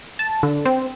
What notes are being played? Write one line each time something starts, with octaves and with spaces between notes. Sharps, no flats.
A5
D3
C4